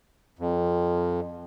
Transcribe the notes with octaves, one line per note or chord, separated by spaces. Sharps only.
F2